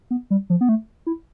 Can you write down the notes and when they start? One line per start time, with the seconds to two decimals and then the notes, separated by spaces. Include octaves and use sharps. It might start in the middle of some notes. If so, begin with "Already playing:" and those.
0.11 B3
0.31 G3
0.50 F3
0.61 B3
0.69 A3
1.07 E4